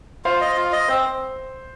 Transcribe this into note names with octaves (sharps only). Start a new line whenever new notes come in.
F4 C5 F5
D#5
F4
D#5
C4 C5